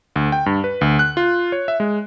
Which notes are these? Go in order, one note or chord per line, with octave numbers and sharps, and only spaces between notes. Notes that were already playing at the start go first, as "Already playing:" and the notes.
D2
G5
G2
B4
D2
F#6
F4
C#5
E5
G#3